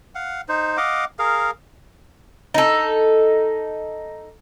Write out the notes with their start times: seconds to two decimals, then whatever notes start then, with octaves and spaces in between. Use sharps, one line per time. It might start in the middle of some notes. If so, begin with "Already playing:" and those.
0.15 F5 F#5
0.49 D#4 C5
0.77 D#5 F5 F#5 D6
1.19 G#4 A#4 F5
2.54 D#4 A4